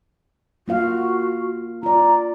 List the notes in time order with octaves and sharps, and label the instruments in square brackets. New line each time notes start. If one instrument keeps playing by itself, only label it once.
[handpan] A#3 F4 F5 [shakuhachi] F#4
[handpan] F4 D5 [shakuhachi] A#5